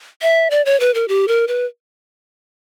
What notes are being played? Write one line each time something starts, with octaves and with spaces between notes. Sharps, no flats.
E5
D5
C#5
B4
A#4
G4
A#4
B4